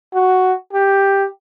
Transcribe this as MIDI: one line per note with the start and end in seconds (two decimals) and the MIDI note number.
0.15 0.53 66
0.73 1.26 67